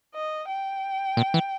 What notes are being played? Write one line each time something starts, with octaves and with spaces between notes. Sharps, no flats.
D#5
G5
A#2
E3